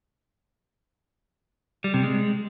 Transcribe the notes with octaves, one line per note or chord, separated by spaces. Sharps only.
G3
C3
G#3